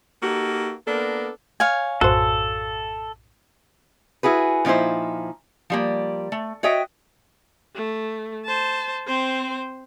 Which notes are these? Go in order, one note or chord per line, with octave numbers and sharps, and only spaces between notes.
A#3 D#4 F#4 G4 A4
A#3 B3 D4 A4 A#4
C#5 F5 G#5
A#1 F#2 A2 F#4 A4 C5
E4 F#4 G#4 B4
A#2 F3 D#4 E4 C5
F3 G3 A#3
A3
F#4 C#5 D#5 E5 G5
A3
C5 A5
C4 C5